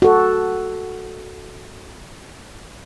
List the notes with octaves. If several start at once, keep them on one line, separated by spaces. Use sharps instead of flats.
F#4 A4